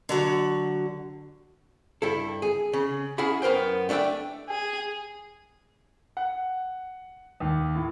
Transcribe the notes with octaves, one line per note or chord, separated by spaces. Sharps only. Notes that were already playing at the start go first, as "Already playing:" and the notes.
D3 F#3 F#4
G2 E4 A4
G#4
C#3
C#4 E4 G#4 E5 F#5 B5
F#2 B3 A#4 C5 G5
A3 D4 F#4 E5 G5
G#4
F#5
D#2
A2